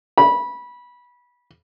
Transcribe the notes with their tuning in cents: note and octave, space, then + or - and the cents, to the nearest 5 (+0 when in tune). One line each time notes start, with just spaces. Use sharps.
B5 -20